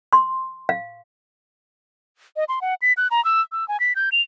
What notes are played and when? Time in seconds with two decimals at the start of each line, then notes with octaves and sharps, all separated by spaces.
0.13 C6
0.69 F5
2.36 D#5
2.49 C6
2.62 F#5
2.82 B6
2.97 F#6
3.11 A#5
3.25 E6
3.52 E6
3.68 G#5
3.80 B6
3.96 G6
4.12 F7